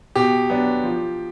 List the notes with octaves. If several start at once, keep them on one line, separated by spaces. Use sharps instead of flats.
B2 G4
F#3 B3 D4
F3